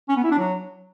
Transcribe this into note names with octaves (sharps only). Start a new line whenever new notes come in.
C#4
B3
E4
D4
F#3